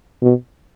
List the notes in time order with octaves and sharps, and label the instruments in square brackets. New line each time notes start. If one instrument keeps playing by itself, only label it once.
[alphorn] B2